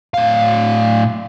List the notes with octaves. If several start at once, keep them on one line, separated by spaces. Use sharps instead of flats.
A2 F5